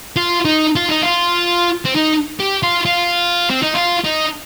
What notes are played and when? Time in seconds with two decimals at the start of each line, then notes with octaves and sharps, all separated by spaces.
0.16 F4
0.45 D#4
0.76 F4
0.89 D#4
1.02 F4
1.85 C4
1.95 D#4
2.40 G4
2.63 F4
2.86 F4
3.50 C4
3.63 D#4
3.75 F4
4.05 D#4